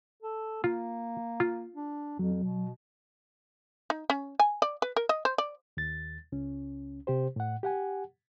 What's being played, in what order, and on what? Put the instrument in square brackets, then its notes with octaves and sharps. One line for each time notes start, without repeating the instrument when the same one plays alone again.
[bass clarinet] A4
[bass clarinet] A#3 [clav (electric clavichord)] F4
[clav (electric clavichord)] F4
[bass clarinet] D4
[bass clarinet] F2 [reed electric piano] F#3
[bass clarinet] B2
[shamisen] D#4
C#4
G#5
D5
B4
A#4
D#5
C5
D5
[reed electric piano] D#2 A6
C#2 C#4
C3 G4 C5
A2 F#5
G4 F#5 G#5